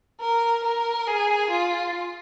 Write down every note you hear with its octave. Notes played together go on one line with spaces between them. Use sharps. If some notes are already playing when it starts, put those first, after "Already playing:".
A#4
A#4
G#4
F4